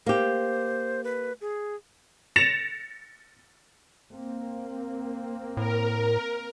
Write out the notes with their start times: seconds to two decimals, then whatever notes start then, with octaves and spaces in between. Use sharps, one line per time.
0.06 A#3 G4 C5
1.04 B4
1.41 G#4
2.36 A6 A#6 C#7 E7 F7
4.12 A#3 C4
5.57 A2 A#4